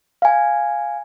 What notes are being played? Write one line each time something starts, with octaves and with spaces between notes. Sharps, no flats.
F5 G#5